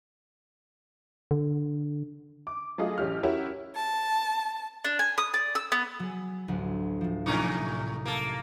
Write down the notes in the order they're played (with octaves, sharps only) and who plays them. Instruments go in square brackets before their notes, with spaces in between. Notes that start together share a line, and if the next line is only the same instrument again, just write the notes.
[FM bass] D3
[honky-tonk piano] D6
F#3 A3 F4 G#4 D#5
A1 C#4 G4 F6
C#4 E4 F#4 G4 A#4 C#5
[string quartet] A5
[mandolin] D4
G#5
D#6
D5
E6
B3
[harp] F#3 G#4
A1 D2 F#3
A2 F3
[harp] C2 E4 D6 [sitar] A2 C#4 D#4
[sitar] A#3 A4